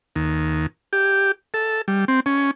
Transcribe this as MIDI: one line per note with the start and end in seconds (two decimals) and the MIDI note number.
0.16 0.66 39
0.93 1.32 67
1.54 1.82 69
1.88 2.05 55
2.08 2.20 60
2.26 2.51 61